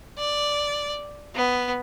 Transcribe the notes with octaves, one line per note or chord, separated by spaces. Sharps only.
D5
B3